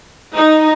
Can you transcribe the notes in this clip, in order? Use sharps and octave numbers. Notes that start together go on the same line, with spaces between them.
D#4